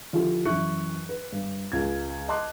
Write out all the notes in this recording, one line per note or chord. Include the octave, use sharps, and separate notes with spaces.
D3 F3 E4 F4 G4 A4
F#2 E3 E4 C#6 F#6 C#7
B4
G2
C#2 C#3 G#6
D#5 A5 C6 D6 F#6